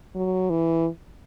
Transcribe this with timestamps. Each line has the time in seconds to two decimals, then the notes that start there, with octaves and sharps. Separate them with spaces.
0.15 F#3
0.50 E3